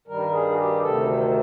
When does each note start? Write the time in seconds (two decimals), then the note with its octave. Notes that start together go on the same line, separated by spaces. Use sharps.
0.08 G2 D#3 G3 A#4
0.32 G#4
0.51 F#4
0.57 G4
0.81 D2 C3 D#3 A4